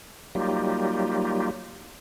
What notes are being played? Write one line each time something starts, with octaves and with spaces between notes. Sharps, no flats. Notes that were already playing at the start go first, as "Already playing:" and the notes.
F#3 G3 A#3 D#4 F4 G4